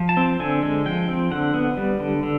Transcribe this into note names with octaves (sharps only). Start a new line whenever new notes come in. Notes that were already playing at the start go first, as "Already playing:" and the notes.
Already playing: F3
A5
C4
D3 G#5
G#3
F3 G5
C4
D3 F#5
B3
G3
D3
D3